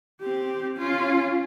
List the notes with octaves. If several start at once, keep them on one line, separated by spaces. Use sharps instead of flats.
C4 G4
C#4 F4